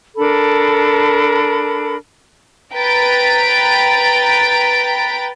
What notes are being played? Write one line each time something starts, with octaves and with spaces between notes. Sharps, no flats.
D4 A4 A#4 B5
B4 G5 A#5 A6 B6 D7